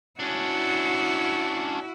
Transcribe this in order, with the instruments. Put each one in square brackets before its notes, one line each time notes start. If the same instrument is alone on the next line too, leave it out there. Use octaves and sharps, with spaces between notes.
[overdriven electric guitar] C#4 D4 [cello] E4 F#4